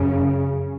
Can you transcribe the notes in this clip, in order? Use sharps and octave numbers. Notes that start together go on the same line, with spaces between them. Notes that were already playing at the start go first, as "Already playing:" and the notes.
Already playing: F#2 C#3